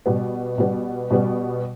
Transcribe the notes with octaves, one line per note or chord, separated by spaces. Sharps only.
B2 G3 B3
B2 G3 B3
B2 G3 B3